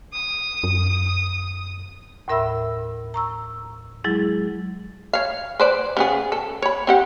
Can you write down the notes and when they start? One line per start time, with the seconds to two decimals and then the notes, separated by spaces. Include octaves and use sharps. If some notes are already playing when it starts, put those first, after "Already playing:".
0.11 D#6
0.63 F#2
2.28 D#2 A2 A#4 E5 B5 E6
3.14 A#5 C#6 E6
4.04 F#3 G#3 E4 G#4
5.13 C#5 F5
5.60 B4 C5 D5
5.97 C#3 B3 G#4
6.32 A4
6.62 C#5 B5
6.87 C4 G4 F#5